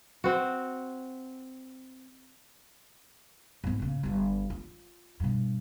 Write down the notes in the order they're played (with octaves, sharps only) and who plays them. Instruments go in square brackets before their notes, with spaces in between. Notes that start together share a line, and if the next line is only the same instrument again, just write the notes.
[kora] C4 F#4
[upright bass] G#2 B3
A#2 C#3
G1 G2
F4
G2 B2